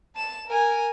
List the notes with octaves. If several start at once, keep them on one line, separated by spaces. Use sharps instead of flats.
A5 E7
A#4 G#5